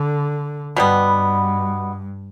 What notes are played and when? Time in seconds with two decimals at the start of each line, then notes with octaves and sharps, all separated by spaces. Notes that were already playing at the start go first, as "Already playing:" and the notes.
Already playing: D3
0.76 G2 B2 G3 B3